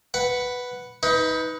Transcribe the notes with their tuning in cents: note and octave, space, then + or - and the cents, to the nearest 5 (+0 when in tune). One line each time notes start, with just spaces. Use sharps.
B4 +0 F#5 +0
D#4 +25 B4 +0